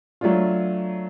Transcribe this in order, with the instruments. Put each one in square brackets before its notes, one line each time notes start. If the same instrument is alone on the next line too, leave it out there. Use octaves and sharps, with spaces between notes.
[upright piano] F#3 A3 D4 F4